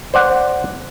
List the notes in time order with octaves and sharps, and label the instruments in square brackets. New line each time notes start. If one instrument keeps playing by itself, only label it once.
[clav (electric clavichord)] C5 D5 F#5